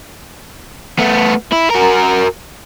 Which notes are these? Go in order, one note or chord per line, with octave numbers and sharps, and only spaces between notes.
A3 B3
E4
F#4 A#4